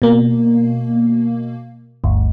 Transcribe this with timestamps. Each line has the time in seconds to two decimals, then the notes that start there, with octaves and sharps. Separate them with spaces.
0.02 B2 A#3
2.04 G1 D2